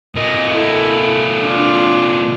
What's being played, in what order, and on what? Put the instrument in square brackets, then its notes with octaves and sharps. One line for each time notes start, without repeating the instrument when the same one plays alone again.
[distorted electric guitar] C3 A#3 [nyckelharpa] D#5
[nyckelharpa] E4 A4
D4 F4